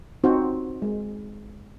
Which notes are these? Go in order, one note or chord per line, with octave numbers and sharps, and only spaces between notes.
C4 D#4 F#4 C5
G#3